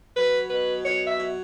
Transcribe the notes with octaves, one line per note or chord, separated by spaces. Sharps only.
F#3 B4
B2 B4
F#3 C#5
E5
F#3